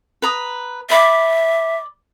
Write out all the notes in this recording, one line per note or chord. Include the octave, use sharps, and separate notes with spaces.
B4 A#5 D#6
D5 E5 B5 D6